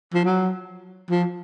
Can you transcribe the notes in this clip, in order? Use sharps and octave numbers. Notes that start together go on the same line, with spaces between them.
F3
F#3
F3